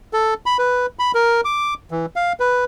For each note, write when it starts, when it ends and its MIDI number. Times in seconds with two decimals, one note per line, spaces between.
0.13 0.34 69
0.46 0.57 83
0.58 0.86 71
0.99 1.12 83
1.15 1.41 70
1.45 1.74 86
1.91 2.06 52
2.16 2.33 77
2.40 2.65 71